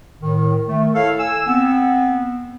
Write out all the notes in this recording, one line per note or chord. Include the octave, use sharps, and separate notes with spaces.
A2 D#3
D#3 A3
E4 A4 C#5 F5
G#5 E6
B3 C4